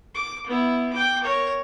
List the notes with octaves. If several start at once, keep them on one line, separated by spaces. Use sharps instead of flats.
D6
B3 E4
G5 D6
A#4 C#5